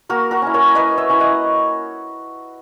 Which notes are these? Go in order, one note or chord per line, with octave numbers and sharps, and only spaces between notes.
A#3 F#4 A#4
F#4 A#4
C#4 E4
A#4 C#5
A#3 B4 D#5
C#5 E5
C#4 E4
D#5 F#5